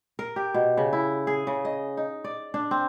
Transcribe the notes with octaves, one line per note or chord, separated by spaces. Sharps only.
A#4
G4
B2
C#3
E4
G#4
C#3
D#5
D#4
D5
D4
C4